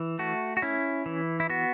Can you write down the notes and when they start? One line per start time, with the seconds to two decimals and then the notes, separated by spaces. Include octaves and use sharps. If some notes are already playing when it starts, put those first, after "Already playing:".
Already playing: E3
0.19 A3 F#4
0.57 F#4
0.62 C#4 E4
1.06 E3
1.40 E4
1.50 B3 F#4